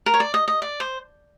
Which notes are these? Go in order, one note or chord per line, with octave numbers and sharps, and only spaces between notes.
A#4
C#5
D5
D#5
D#5
D5
C5